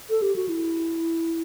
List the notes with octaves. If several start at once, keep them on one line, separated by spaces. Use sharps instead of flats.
A4
G4
F#4
E4